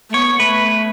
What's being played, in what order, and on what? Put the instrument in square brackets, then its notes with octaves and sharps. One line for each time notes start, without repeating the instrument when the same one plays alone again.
[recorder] A3
[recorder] B3 [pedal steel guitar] C#5
[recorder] A3 [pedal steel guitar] B4